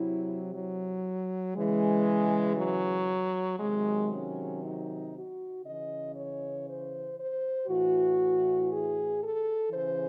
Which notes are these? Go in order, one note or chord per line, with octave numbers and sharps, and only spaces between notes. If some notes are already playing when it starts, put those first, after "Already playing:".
Already playing: C3 F#3 E4
F#3
C#3 E3 G#3
F#3
C3 D#3 F#3 G#3
C#4
D#4
F#4
C#3 D#5
E3
C#5
C5
C5
A2 E3 F#4
G#4
A4
C#3 E3 C5